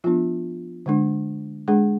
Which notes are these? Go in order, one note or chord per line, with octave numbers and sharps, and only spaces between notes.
F3 B3 D4 F4
D3 G#3 D4
G#3 D4 G#4